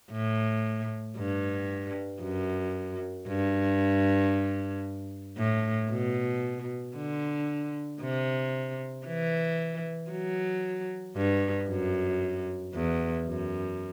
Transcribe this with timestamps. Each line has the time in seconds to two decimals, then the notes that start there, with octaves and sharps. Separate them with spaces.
0.11 A2
1.17 G2
2.22 F#2
3.28 G2
5.38 A2
5.90 B2
6.96 D3
8.01 C3
9.06 E3
10.11 F#3
11.16 G2
11.69 F#2
12.74 E2
13.27 F#2